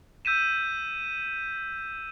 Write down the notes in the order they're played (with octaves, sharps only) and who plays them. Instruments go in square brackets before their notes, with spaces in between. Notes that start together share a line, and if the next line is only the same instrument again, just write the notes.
[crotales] E6 G6 B6 D#7 E7